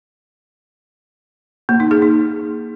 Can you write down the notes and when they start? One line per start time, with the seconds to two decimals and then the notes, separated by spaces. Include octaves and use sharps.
1.69 A#3
1.80 D#4
1.91 G#4
2.02 D#4